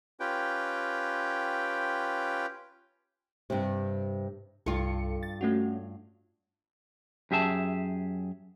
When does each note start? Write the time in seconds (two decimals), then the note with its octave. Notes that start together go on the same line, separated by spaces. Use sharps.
0.20 C#4 F4 G4 B4 G5
3.50 G2 C3
4.66 C2 G2 F4 A4 C#7
5.23 A6
5.41 A3 C#4 F#4
7.31 F#2 G4 G#4 E5 A5